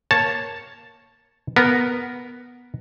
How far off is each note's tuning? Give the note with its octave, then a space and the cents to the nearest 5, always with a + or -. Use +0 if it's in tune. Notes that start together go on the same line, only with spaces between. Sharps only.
A#3 +0 C#5 +0 A5 +0
B3 -5 A#4 +0